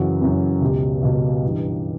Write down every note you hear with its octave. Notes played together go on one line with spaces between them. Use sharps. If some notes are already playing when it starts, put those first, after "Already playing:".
Already playing: F#2 C#3 E3 F#4
F#2 C#3 E3
C#2 B2 G4
C#2 B2
G2 E3